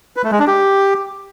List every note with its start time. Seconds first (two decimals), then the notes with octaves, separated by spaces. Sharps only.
0.16 B4
0.24 A3
0.32 G#3
0.40 D4
0.47 G4